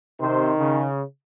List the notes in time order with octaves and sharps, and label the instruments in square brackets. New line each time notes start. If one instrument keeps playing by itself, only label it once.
[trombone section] C3 C5 [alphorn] D#3
[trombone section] C#3